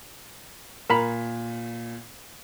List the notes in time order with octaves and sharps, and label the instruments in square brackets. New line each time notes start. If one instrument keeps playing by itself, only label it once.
[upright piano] A#2 B6 [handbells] A#4 A#5 B5